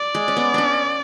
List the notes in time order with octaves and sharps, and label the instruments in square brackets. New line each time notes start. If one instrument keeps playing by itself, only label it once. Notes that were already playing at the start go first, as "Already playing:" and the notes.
Already playing: [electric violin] D5
[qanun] G#3
C#4
B3
C#4 D4